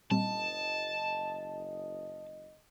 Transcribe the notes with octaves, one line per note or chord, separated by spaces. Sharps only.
F#1 A#2 G3 C4 D#5 A5